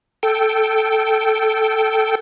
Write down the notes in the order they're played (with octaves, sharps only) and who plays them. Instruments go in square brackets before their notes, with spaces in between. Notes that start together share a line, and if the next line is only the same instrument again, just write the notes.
[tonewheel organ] A4 G5